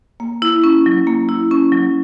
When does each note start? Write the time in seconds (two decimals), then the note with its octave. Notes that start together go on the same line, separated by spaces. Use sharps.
0.20 A#3
0.42 E4
0.64 C#4
0.86 F#3
1.07 A#3
1.29 E4
1.51 C#4
1.72 F#3